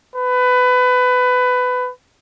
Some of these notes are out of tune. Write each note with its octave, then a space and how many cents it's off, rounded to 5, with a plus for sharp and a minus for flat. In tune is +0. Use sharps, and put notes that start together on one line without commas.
B4 +20